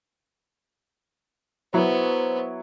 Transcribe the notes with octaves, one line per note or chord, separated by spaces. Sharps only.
F#3 B3 E4 C5